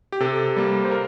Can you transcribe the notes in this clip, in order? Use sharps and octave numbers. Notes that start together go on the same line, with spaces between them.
G4
C3 A4
G3 A#3
C5
A#4